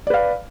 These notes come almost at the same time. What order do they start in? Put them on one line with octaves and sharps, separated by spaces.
D5 B4 F5